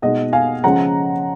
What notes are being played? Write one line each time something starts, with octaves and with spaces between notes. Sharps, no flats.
B2 G#3 D#4 D#5 F#5
F5 G#5
C#3 F3 G#3 C#4 F#5 A#5